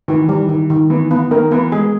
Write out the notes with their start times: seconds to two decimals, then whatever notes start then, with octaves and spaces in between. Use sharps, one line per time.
0.08 D#3 E3
0.29 G3
0.49 D#3
0.70 D#3
0.90 E3 B3
1.11 B3
1.31 D#3 A#4
1.51 E3 B3
1.72 G#3 G#4